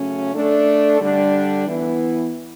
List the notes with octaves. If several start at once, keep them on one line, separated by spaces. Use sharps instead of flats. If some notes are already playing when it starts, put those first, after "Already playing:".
Already playing: C#3 F#3 A3 C#4
A3 D4 A4
D3 G3 D4
E3 B3 E4